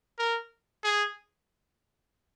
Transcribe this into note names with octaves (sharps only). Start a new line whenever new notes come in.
A#4
G#4